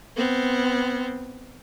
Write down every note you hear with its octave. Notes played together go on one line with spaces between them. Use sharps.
B3 C4